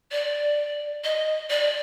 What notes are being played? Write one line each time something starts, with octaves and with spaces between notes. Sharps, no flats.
D5
D#5
D5